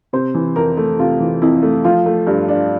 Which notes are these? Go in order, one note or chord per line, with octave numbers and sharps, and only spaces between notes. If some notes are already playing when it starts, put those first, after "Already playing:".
C3 C5
E3
F2 A#4
A3
C3 F4
E3
F2 E4
A3
F3 F4
A3
G2
D4